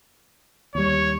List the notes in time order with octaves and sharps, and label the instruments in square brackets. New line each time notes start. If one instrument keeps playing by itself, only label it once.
[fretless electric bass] D#2 G3 [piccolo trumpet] C#5